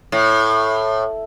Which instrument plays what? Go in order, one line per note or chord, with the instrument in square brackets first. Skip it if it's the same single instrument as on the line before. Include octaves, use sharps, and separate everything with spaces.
[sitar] A2